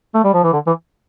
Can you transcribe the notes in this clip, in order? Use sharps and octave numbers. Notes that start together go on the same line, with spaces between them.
A3
G3
F3
E3
D3
E3